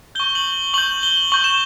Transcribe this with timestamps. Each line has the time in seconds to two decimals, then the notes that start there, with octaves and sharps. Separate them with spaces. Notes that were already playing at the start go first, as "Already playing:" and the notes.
0.15 C#6 G6 G7
0.35 F#7
0.74 C#6 G6 F#7
1.03 G7
1.32 C#6 G6 F#7
1.44 E7